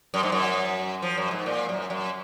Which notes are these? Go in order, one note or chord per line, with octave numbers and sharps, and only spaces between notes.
F#2
G#2
F#2
F3
F#2
G#2
A#2
F#2
F#2